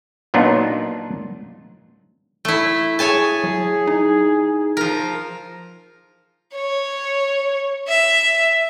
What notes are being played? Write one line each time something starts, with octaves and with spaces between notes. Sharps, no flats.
A#2 F#3 B3 D4 D#4 F4
A3 E4
G#4 C#5 G#5 A5
F#3
D#4
F3 A#4
C#5
E5